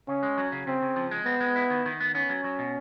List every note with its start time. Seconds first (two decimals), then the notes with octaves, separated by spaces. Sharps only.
0.08 C#3 C#4
0.23 G#3
0.37 F#3
0.52 C#3
0.67 C#3 C4
0.82 C#3
0.96 F3
1.11 G#3
1.26 B3 C4
1.40 G#3
1.56 E4
1.70 D#3
1.86 D#3
2.00 B3
2.15 B3 C#4
2.30 F#3
2.44 F#3
2.59 B2